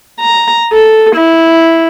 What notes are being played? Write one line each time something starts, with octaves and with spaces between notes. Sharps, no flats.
A#5
A4
E4